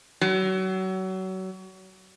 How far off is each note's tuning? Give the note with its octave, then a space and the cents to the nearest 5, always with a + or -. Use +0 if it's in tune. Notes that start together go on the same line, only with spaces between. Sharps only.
F#3 +30